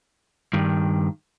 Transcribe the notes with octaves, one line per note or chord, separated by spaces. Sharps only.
G2 D#3